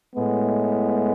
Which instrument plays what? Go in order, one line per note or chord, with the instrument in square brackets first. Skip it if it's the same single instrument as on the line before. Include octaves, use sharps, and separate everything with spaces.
[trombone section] A2 G#3 B3